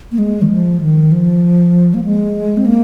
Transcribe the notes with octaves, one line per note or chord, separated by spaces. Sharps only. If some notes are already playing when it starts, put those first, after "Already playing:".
A#3
G#3
D#3
F3
D#3
F3
A#3
G#3
C4
A#3